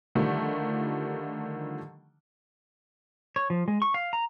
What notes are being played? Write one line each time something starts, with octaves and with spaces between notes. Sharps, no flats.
D3 D#3 F3 G3 A3
C#5
F3
G#3
C#6
F5
A#5